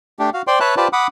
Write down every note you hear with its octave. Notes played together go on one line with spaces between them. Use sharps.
A3 D4 G4
F#4 F5
C5 D5 G5 C6
B4 C#5 E5 A5 F#6
F4 G4 B4 C5 D5 A5
F#5 B5 D6 D#6